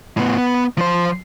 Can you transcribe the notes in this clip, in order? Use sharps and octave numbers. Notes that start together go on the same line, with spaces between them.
A2 B3
B3
F3 C5